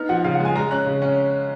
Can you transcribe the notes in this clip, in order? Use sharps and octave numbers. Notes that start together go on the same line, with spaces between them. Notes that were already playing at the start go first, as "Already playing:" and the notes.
Already playing: B3 D#4 F6
F3 F#5
C#3 F5
F#5
G#3
G#5
G#3 A#5
C#4 F#6
C#3
C#4